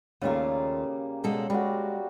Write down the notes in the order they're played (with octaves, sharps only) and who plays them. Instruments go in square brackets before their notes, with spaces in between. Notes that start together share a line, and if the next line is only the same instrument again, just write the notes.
[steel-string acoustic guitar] D#2 A3 F4 [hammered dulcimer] C#3 G3 A#3
[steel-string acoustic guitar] B2 G#3 A4
[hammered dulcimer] G3 F#4 [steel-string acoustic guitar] G#3